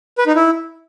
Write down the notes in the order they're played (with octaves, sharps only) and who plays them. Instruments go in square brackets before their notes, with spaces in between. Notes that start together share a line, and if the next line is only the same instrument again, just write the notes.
[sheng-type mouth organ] B4
D#4
E4